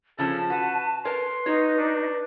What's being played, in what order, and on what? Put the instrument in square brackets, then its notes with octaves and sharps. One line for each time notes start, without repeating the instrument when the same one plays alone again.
[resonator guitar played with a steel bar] C#3 F3 C#4 [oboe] A4 [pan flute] A5
[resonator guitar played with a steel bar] F#4 [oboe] B4
[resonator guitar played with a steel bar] A#4 C#5 A5 [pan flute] B4 [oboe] C6
[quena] D#4 [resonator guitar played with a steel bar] F#4 C#5
[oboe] D4